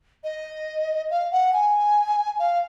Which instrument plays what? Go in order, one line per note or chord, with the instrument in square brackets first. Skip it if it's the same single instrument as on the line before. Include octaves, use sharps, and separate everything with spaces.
[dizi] D#5
F5
F#5
G#5
F5